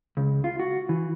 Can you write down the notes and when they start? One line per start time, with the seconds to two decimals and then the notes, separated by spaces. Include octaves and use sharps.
0.17 C#2
0.44 F4
0.59 F#4
0.89 E3